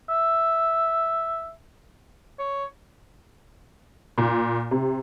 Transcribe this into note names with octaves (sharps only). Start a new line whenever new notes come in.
E5
C#5
A#2
C3